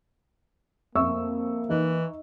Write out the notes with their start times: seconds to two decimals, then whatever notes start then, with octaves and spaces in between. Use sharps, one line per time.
0.95 F2 A#3 E5 C#6 E6
1.69 E3 D#4